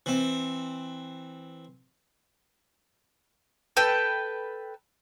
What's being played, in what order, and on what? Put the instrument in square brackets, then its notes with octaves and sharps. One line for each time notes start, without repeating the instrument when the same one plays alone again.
[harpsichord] E3 C4
[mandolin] A4 B4 G5